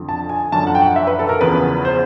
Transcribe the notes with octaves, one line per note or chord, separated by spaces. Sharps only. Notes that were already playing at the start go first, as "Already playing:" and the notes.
Already playing: F2 D3 F3
A5
G#5
F#2 D3 F3 A5
F#5
G5
F#5
E5
B4
A4
A#4
E2 C#3 F3 B4
C5